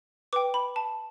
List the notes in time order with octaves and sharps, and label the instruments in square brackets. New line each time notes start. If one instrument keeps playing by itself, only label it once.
[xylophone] B4 G5 D6
B5
A5